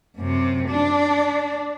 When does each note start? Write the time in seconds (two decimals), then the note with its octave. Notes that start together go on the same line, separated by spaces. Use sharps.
0.17 F#2 C3
0.69 D4